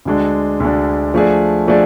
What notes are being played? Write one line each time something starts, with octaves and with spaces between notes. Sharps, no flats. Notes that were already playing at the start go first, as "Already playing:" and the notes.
D2 D3 G#3 D4
D2 D3 G#3 D4
F3 A3 D4 G#4 D5
F3 A3 D4 G#4 D5